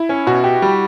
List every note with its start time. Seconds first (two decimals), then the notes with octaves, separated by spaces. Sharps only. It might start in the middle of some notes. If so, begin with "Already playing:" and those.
Already playing: E4
0.09 C#4
0.27 B2 F#4
0.44 G4
0.62 G3